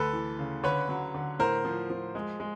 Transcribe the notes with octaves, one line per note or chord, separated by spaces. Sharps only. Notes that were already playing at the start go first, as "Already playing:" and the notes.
Already playing: D2 A4 B4
E3
C#3
D3 B4 C#5
F#3
D3
A2 A#4 C5
F3
F3
G#3
G#3